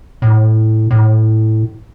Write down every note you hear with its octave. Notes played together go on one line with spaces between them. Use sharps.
A2
A2